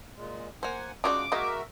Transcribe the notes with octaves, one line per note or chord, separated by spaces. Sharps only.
A#2 G#3
A#3 C5 F#5 G#5
C#3 G#3 D4 D#4 F4 F#4 D5 D6
G#3 A#3 D#4 F#4 A#4 D#5 E5